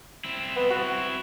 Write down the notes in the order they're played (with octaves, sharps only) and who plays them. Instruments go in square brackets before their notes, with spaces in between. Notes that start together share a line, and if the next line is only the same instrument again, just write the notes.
[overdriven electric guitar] C4 E4
[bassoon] B3
F#4